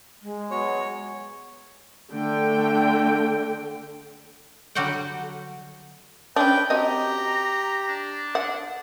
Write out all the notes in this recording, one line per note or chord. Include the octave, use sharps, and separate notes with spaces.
G#3
F#3 B3 F#4 C#5
D3 A3 G5
D3 F#3 G3 F#4 F#5 G5
C#4 D4 B4 G5
C4 F#4 G4 D#5 A#5
D4
F#5